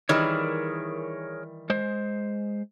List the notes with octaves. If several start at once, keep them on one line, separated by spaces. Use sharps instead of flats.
D#3 E3 G3 G#4 A#4 C#5
G#3 C5